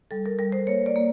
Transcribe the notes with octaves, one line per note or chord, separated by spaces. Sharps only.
G3 A4
A#4
G3 A#4
C5
A#3 C#5
D5
A#3